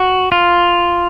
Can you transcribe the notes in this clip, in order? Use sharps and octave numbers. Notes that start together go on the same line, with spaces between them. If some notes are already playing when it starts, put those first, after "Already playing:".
Already playing: F#4
F4